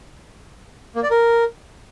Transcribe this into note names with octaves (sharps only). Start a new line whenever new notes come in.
A#3
D5
A#4